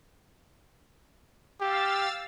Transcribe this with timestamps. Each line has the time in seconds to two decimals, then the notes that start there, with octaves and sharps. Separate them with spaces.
1.61 G4 F5 E6 A6